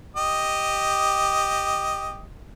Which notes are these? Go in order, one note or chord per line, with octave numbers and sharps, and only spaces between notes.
G4 D#5